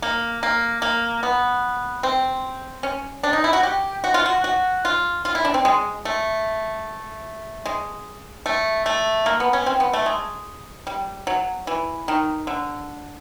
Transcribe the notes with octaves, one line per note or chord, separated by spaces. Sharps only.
A#3
A#3
A#3
B3
C4
C#4
D4
D#4
E4
F#4
G4
F#4
F4
F#4
F#4
F4
F4
E4
D4
C4
G#3
A3
G#3
A3
A3
A#3
B3
C#4
C4
B3
A3
G#3
G3
F#3
E3
D#3
D3